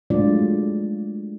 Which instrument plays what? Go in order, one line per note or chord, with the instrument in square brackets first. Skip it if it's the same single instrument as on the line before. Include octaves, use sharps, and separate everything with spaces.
[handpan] F#3 G#3 A3 D4 F4 D5